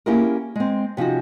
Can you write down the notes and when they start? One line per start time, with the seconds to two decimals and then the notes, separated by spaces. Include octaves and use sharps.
0.06 A#3 C#4 E4 G4 G#4 A#4
0.56 G#3 C4
0.97 C3 F3 C#4 D#4 F#4